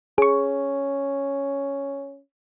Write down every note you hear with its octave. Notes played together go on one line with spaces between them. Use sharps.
C#4 G#4 C#6